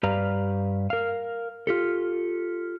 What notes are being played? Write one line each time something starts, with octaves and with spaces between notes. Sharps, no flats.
G2 G4 B4 D5 F5 A#5
A#4 F5
F4 G4 A4